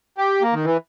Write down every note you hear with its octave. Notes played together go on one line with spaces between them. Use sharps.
G4
A#3
D#3
E3